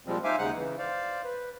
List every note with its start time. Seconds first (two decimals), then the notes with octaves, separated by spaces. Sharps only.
0.06 A#2 F3 G3 G#3 C4
0.24 D#4 C5 E5 F5 G#5 D6
0.39 D#2 C#3 G#3 D#4 F#5 F#6
0.54 C#3 E3
0.78 C5 D5 F5
1.24 B4